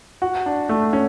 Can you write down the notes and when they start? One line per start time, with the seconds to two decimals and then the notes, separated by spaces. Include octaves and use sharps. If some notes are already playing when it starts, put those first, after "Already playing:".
0.22 F#4
0.46 D4
0.69 A3
0.93 C#4